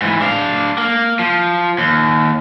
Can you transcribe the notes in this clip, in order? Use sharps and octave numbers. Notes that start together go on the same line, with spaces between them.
G#2 E3
D4 F5
A#3
F3
D#2